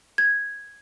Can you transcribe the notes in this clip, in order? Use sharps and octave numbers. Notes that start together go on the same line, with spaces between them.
G#6